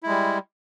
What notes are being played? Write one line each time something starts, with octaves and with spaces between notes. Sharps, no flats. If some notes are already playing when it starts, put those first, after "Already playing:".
G3 G#3 E4